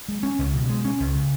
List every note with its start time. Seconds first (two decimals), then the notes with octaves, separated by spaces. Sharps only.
0.08 G#3
0.23 C#4
0.39 C#2
0.54 B2
0.69 G#3
0.85 C#4
1.00 C#2
1.15 C#3